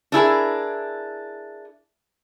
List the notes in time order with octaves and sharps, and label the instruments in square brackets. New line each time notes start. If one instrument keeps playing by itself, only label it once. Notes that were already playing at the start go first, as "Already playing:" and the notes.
[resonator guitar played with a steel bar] D4 E4 G#4 A#4